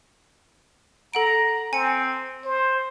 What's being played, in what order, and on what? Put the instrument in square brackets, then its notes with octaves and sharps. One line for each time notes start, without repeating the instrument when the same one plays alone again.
[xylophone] A4 F#5 D7 [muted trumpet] A#5
[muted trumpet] C4 [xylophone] G#5 C#7
[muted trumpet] C5